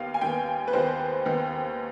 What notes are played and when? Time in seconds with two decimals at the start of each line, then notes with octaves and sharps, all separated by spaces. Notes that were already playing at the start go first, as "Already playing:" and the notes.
Already playing: D#2 D#3 B3 F5
0.14 G#5
0.21 D#2 D#3 B3 G5
0.68 B4
0.73 D#2 D#3 B3 C5
1.25 D#2 D#3 B3